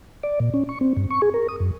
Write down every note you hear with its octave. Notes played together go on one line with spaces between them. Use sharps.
D5
A#2
C#4
C#6
C4
G2
C#6
G#4
A#4
D#6
F#2